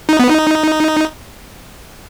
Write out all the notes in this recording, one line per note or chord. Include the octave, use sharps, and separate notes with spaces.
D#4
B3
D#4